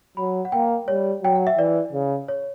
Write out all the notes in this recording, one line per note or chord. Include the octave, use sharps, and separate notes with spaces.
F#3 B5
F#5
A#3 G5
G3 C#5
F#3 G5
F#5
E5
E3 D5
C#3
C#5